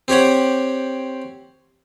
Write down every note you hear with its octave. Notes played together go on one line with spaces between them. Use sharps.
C4 G4 C#5 F#5